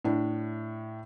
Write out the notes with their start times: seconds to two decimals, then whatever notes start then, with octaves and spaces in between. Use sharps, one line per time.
0.05 A2 D4